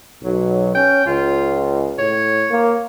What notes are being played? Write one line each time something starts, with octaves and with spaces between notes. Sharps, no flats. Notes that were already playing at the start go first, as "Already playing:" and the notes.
B1 F#3
C#4 G5
C#2 F4
A2 C#5
A#3